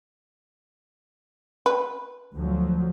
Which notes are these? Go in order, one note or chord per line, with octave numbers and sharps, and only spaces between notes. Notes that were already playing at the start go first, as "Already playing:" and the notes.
B4
D2 F3 F#3